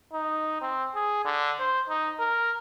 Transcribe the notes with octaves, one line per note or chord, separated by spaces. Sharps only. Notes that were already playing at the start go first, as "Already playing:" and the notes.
D#4
C4
G#4
D3
C5
D#4
A#4